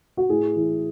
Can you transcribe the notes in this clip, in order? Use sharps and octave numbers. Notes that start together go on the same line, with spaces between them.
F#4
A2 G#4
E3